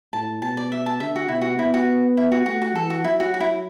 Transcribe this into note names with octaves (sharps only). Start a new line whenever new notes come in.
A2 A5
B2 A5
D5
E5
A5
D3 E5
F#4
B2 E4
F#4
B3 E4
F#4
E4
F#4
A3 F#4
F#4
E3 A4
F#4
F#3 E4
F#4
F#4
E4